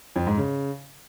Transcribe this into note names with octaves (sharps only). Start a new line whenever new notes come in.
F2
G#2
C#3